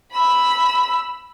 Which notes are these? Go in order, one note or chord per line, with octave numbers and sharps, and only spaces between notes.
B5 E6